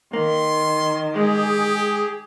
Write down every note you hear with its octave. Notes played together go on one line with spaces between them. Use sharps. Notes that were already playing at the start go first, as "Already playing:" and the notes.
D#3 A#3 C6
G#3 G4 G#4